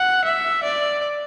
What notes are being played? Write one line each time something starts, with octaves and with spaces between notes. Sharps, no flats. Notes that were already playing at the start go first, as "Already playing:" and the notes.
Already playing: F#5
E5
D5